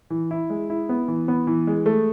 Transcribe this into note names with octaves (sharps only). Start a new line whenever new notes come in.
E3
E4
G#3
E4
B3
E3
B3
E3
G#3
A3